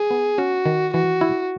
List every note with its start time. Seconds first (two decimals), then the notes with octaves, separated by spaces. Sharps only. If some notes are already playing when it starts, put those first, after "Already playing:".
Already playing: G#4
0.11 B3
0.38 C#4 F#4
0.66 D#3
0.94 E3 F#4
1.21 E4